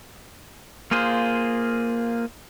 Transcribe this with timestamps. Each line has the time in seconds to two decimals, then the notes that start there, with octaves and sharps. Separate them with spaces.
0.91 A#3 F4 G#4 C5